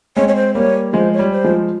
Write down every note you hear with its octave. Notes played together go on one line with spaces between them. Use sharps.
G#3 C4 C#5
C#5
C5
G3 A#3 C#5
F3 G#3 C5
C#5
G3
C5
F3 G#3